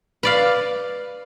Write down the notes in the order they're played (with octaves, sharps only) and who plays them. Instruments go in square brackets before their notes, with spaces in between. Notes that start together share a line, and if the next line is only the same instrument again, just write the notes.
[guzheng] B4 D5 F5